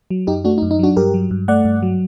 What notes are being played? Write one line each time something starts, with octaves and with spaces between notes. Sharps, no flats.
F#3
F#2 D#4 G4
A3 D4 F#4
D#4
F#2
D#4
F#3 D4 F#4
G2 G4 A#4
F#3
G2
A3 D5 F#5
G2
F#3